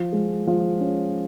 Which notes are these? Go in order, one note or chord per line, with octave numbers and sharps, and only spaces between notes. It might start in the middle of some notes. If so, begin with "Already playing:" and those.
Already playing: F3
G#3
F3
C#4